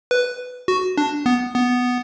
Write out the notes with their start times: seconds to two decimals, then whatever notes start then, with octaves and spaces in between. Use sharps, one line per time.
0.11 B4
0.68 F#4
0.98 D4
1.26 B3
1.54 B3